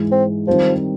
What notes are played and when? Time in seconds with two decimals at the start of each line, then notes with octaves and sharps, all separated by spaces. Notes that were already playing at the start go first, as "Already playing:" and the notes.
Already playing: G#2 E3 G#3
0.12 C4
0.47 D#3 F3 G3 C4 D#4